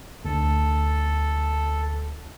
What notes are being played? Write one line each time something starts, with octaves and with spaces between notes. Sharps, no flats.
D2 A4